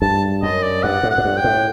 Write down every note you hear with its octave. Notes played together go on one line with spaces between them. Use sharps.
G2 A5
F#2 D#5
D5
G2 F#5
A2
F#5
A2
G2
G5
A2